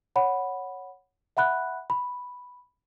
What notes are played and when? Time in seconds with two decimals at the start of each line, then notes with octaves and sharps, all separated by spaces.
0.16 C#5 F#5 B5
1.37 E5 F#5 B5 F#6
1.90 B5